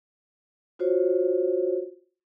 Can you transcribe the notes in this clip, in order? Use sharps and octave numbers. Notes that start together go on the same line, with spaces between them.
F4 F#4 C5 C#5